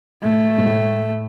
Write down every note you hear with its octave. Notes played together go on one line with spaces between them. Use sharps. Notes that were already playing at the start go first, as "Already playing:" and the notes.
A2 A3
G#2
A2